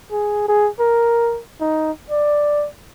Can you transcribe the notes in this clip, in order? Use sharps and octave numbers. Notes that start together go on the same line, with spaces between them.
G#4
G#4
A#4
D#4
D5